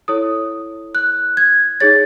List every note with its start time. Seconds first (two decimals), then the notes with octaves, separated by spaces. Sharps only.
0.08 E4 A4 C#5 D#6
0.95 F#6
1.37 G#6
1.80 D#4 G#4 C#5 A6